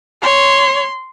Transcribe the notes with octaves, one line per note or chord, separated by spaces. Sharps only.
C#5 C6